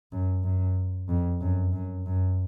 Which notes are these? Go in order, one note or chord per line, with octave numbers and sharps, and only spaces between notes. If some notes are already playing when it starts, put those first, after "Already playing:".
F#2
F#2
F2
F#2
F#2
F#2